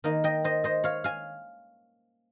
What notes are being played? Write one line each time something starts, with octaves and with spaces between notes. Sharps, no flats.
D#3 A#3 D#4
D#5 G5
C5 D#5
C5 D#5
C#5 F5
F5 G#5